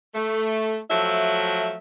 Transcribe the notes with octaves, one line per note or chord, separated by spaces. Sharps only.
A3
F3 F#3 A3 E5